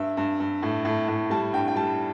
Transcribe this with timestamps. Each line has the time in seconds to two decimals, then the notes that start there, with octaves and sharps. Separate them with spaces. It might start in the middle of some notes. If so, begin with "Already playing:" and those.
Already playing: G2 E5
0.17 G2
0.40 G2
0.63 A2
0.85 A2
1.08 A2
1.30 G3 A5
1.53 G2 G5
1.68 G5
1.76 G3 A5